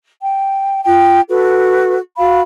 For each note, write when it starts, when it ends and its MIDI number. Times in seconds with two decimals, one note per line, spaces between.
0.20 0.80 79
0.85 1.20 65
0.85 1.20 79
1.28 1.96 66
1.28 1.96 69
1.28 1.96 71
2.17 2.40 66
2.17 2.40 77
2.17 2.40 83